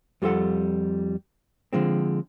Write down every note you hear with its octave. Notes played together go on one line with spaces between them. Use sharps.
F2 G3 F4 A4 F#5
D3 F3 G#3 C4